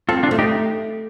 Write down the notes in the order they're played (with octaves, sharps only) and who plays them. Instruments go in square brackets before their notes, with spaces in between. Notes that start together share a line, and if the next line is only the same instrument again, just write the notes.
[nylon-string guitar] C4 [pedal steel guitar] F4 A4
[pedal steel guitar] D4 F4
[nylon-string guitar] A3
[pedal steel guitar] D#4 G4